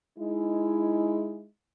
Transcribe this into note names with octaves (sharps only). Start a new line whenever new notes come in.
G#3 D#4 E4